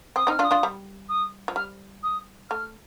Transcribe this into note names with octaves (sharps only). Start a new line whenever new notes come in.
C4 D#6
C4 D#4 F6
D4 F4
D#6
D4 F4
G3
D#6
F3
G3 F6
D#6
A3 F6